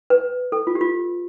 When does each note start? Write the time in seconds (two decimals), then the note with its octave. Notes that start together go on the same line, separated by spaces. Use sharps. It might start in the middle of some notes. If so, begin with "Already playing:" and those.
0.10 B4
0.52 A4
0.67 F4
0.75 G4
0.81 F4